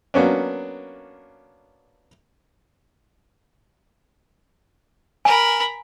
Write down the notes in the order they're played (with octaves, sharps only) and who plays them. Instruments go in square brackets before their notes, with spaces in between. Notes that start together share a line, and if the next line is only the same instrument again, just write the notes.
[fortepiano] F#3 A#3 B3 C#4 D4
[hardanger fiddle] A#4 B5 [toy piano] G#5